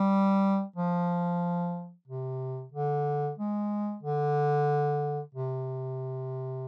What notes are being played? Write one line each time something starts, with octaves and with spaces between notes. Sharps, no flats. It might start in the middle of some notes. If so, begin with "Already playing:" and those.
Already playing: G3
F3
C3
D3
G#3
D3
C3